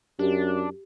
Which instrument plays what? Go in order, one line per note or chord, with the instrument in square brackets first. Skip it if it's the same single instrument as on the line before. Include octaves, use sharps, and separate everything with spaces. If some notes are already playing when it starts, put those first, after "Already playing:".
[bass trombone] F#2 [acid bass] D4 [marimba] G4